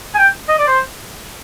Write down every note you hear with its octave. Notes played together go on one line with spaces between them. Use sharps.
G#5
G5
D#5
D5
C5